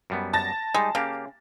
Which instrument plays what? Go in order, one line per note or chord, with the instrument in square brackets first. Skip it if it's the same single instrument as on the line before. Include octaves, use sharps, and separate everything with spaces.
[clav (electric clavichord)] F#2 G3 B3
[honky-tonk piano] A5 A6 A#6
[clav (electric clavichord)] G3 D#4 [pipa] G#3
[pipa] C#3 [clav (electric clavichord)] A#3 G4 F5